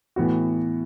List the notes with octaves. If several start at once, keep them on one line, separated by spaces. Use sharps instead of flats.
A2 E3 B3 F#4